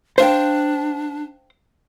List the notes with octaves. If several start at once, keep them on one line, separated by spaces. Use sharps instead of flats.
D4 C5 F5 G5